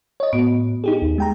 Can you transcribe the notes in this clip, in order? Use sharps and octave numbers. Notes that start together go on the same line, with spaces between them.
C#5 D#5
A2 B3 F#4
D#4 G4 G#4
D#2
G#3 G5 A#5